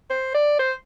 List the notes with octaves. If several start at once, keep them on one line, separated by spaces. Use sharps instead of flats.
C5
D5
C5